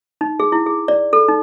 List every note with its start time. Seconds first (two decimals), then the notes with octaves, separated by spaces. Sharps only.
0.21 D#4
0.40 G#4
0.52 E4
0.66 G#4
0.88 D5
1.13 A4
1.28 D#4